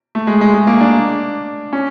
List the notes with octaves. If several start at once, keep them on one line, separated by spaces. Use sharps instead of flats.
A3
G#3
G#3
G#3
A#3
D4
C#4